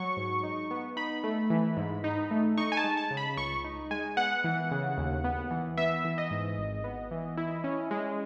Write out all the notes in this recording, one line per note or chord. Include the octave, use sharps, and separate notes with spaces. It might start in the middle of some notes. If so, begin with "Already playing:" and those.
Already playing: F#3 C#6
G#2
D#4
B3
D#4 B5
A3
E3
G#2
D#4
A3
D#4 C#6
G#5
A5
G#3
A5
C#3
B5
C#2 C#6
D#4
G#3 G#5
B3 F#5
E3
C#3
D#2
B3
E3
B3 E5
E3
D#5
G#2
G#1
B3
E3
E4
C#4
G#3